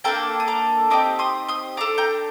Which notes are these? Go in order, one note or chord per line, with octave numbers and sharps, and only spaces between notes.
A#3 D4 F4 A4 G5 A#5
D#6
A#5 D6
C4 D#4 G4 A#5 D6
C6 D#6
C6 D#6
D4 A4 A#5 D6
G5 A#5